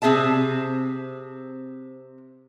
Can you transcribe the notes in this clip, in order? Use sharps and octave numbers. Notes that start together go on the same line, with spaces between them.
C3 C4 G#4 E5 A5